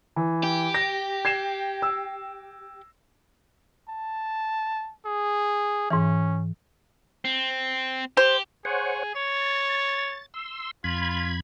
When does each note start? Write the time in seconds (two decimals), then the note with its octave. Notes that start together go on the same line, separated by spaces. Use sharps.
0.16 E3
0.43 G4
0.74 A#6
1.25 G#6 C7 E7
1.82 E6
3.88 A5
5.05 G#4
5.90 G#2 E3 C#4
7.25 C4
8.17 G4 C5
8.65 G#4 C5 C#5 F#5
9.15 C#5 A6
10.34 C6 E6
10.84 F2 F4 B5 G#6